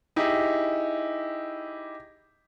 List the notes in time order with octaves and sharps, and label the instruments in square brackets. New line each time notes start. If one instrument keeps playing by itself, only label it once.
[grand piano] D#4 E4 G4 G#4